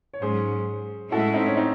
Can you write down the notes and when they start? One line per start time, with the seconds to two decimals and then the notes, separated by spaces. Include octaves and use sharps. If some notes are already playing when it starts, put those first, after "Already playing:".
0.14 C#5
0.22 G#2 F#3 C#4 G#4 C5
1.12 A2 G#3 C#4 E4 F#4 A4
1.34 C4 D#4
1.46 C#4
1.57 C4 D#4